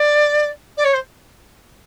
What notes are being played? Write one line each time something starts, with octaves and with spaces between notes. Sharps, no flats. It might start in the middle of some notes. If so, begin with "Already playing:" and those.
Already playing: D5
D5
C#5
C5